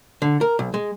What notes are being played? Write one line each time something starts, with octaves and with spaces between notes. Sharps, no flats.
D3
A#4
B1
G#3